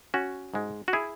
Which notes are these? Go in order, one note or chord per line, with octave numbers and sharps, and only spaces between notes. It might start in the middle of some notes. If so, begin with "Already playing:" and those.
C#4 F#4
G#2 G#3
F#4
E4 G#4